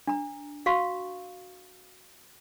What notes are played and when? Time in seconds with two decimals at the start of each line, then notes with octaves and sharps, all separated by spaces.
0.08 D4 A#5
0.66 F#4 F5 C#6